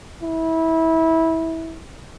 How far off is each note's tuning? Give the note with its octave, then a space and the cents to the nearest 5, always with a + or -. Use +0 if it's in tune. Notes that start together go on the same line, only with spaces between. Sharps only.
E4 -20